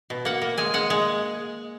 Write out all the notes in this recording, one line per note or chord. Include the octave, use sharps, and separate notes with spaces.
B2
A#3 F#5
A#3
G#3 G#5
G#3 F#5
G#3